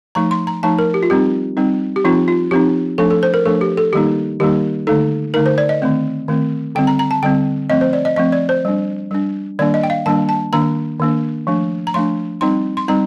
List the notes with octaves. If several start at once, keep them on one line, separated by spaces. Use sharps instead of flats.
F3 A3 D#4 A#5
C6
A#5
F3 A3 D#4 A5
A#4
G4
F4
G3 C4 D#4 G4
G3 C4 D#4
G4
F3 C4 D#4 F4
F4
F3 C4 D#4 G4
F3 A3 D4 A4
A4
C5
A#4
F3 A3 D4 A4
G4
A4
D#3 G3 A#3 D#4 G4
D#3 G3 A#3 D#4 G4
D3 A3 D#4 A4
D3 A3 D#4 A#4
C5
D5
D#5
D#3 A3 C4
D#3 A3 C4
D3 G3 C4 G5
A#5
A#5
A5
D3 G3 C4 G5
F3 A3 C4 D#5
C5
D5
D#5
F3 A3 C4 D#5
D5
C5
G3 D4
G3 D4
D#3 G3 A#3 D4 D5
D#5
G5
F5
D#3 G3 A#3 D4 A5
A5
D#3 A#3 D4 A#5
D#3 A#3 D4
F3 A3 D4
A#5
F3 A3 D4 C6
G3 C4 D#4 C6
C6
G3 C4 D#4 A#5